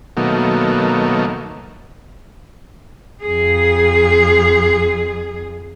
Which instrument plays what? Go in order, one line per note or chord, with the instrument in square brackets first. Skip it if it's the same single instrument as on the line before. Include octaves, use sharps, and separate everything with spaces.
[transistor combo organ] B2 D#3 F#3 A3 A#3
[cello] F2 G#4